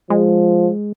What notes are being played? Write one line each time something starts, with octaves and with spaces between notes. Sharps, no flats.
F3 G#3